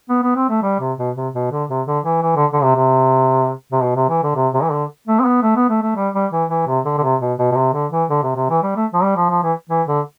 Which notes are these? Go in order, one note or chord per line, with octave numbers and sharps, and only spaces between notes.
B3
B3
C4
A3
G3
C3
B2
C3
B2
D3
C3
D3
E3
E3
D3
D3
C3
C3
C3
B2
C3
E3
D3
C3
C3
E3
D3
A3
C4
B3
A3
B3
A3
A3
G3
G3
E3
E3
C3
D3
D3
C3
B2
B2
B2
C3
D3
E3
D3
C3
C3
E3
G3
A3
F3
G3
F3
F3
E3
E3
D3